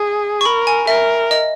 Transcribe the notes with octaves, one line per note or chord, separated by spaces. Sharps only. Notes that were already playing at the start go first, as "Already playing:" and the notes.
Already playing: G#4
C#6
A#4 B5
G#5
A#4 E5
D#5